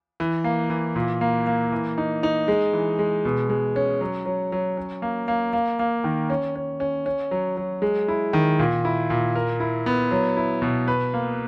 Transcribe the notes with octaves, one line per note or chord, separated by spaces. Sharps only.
E3
A#3
E3
A#2
A#3
A#3
E3
D#4
D#4
G#3
E3
G#3
B2
G#3
C#4
F#3
F#3
F#3
C#4
A#3
A#3
A#3
A#3
D#3
C#4
C#4
C#4
C#4
F#3
F#3
G#3
E4
D#3
A#2
E4
A#2
A#4
E4
B3
F#3
E4
B2
B4
A#3